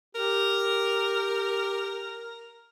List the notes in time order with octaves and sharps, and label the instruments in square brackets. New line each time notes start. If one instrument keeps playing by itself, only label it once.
[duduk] G4 [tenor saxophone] A#4